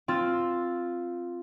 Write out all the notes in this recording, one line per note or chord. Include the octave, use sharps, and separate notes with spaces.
C4 F4 E6 A6